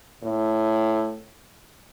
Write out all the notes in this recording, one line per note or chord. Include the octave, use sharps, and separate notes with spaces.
A2